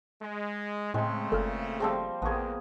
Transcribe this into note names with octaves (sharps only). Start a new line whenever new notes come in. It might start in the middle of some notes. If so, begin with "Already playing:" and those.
G#3
A2 C#3 G#3 A3 C4
F#1 A#2 A4 F6
F3 G3 C4 G#4 A5 E6
A1 F2 A#3 B3 G#4 A5 C#6